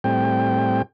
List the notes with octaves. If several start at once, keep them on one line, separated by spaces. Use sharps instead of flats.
A2 G3 C4 G5